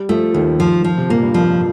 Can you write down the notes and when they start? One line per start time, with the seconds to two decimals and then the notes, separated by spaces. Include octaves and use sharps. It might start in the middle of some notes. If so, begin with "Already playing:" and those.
Already playing: G3
0.09 F3 A3
0.34 D#2 D#3
0.60 F3
0.85 F3
0.97 C3
1.09 A#2 A#3
1.23 G2
1.34 F2 F3